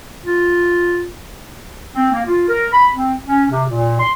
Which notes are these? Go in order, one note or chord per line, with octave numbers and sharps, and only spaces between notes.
F4
C4
A#3
F4
A#4
B5
C4
C#4
C3
A#2
C6